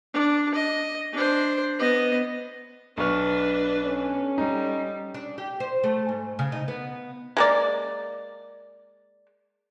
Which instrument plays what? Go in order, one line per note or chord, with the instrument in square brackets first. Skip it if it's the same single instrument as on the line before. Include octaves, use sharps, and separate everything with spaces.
[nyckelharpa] D4
D#5
D4 C5
B3 D#5
[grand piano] B1 C#6 F6 [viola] D4 B4
[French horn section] C#4 A4
[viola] G3 [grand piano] D#4
[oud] D4
G4
C5
A3
G#2
C#3
D#4
B3
[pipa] G#3 A#3 D5